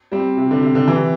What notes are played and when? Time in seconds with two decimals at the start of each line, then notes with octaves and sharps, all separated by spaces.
0.12 G3 C4
0.37 C3
0.51 D3
0.63 C3
0.75 D3
0.88 C3 E3